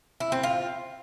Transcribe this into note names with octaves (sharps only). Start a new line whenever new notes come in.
E4
C4
F4